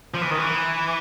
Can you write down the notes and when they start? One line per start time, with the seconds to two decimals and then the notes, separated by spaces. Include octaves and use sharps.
0.14 F3
0.21 E3
0.31 D#3
0.38 E3